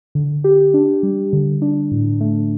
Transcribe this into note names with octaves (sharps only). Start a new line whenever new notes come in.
D3
G4
D4
G3
D3
D4
A2
A3